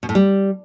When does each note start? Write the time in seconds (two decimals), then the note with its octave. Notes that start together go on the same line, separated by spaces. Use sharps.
0.03 B2
0.09 A2
0.15 G3